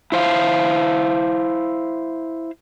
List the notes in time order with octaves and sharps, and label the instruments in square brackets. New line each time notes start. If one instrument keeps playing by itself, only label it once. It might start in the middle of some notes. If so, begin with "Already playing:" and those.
[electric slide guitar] E4 C5 F5